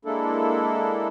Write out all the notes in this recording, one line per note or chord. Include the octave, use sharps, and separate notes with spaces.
G#3 A#3 D4 E4 A4